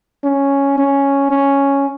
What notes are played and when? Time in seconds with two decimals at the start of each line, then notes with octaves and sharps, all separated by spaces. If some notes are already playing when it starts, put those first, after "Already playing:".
0.24 C#4
0.78 C#4
1.31 C#4